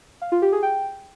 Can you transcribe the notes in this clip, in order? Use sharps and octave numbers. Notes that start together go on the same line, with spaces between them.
F5
F4
G4
G#4
G5